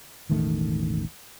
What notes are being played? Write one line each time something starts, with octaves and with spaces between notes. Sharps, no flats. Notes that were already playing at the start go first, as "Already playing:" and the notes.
E1 A1 D#3 A3